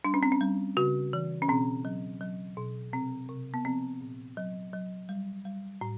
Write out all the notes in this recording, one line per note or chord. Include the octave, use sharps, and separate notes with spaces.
G3 D4
C#4
C4
C#4
G3
C#3 F#4
E3
C#4
B2 C4
F#3
F#3
B2
C3 C4
C3
B3
F3 C4
A#2
F#3
F#3
G3
G3
A2